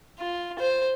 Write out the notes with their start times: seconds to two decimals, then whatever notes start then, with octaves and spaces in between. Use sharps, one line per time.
0.19 F4
0.59 C5